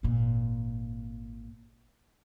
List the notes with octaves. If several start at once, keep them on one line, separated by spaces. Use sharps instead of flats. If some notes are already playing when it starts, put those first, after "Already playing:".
G#1 A#2